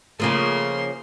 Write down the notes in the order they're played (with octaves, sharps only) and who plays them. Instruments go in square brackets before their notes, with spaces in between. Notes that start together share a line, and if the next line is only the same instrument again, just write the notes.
[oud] C#3 F3 A3 [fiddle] A#3 C6